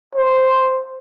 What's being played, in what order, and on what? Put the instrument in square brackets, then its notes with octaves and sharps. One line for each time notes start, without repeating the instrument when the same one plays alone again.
[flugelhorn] C5